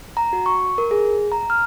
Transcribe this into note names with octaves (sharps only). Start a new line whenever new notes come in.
A#5
F#4
C#6
A#4
G#4
A#5
F6